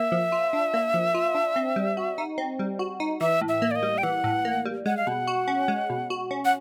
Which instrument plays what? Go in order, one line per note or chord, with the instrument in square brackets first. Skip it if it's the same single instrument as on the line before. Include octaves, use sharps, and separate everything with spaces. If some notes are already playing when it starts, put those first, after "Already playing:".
Already playing: [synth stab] A#3 [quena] E5
[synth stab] F3
F4
D4
A#3
F3
F4
D4
C4
G3
F#4
D#4
C4
G3
F#4
D#4
[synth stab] E3 [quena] E5
[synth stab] A2
[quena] E5
[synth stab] A#3
[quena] D5
D#5
[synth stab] G3
[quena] G5
[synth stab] E3 [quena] F#5
[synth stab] A2
A#3
G3
[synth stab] G#3 [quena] F#5
[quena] F5
[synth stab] B2 [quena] F#5
[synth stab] F#4
C#4
G#3
B2
F#4
C#4
[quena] F#5